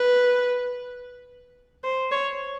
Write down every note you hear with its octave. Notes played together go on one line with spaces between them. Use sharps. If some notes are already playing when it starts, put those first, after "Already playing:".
Already playing: B4
C5
C#5